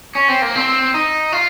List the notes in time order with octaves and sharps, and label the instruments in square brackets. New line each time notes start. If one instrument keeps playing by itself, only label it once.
[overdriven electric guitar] C#4
C4
A#3
C4
D#4
F4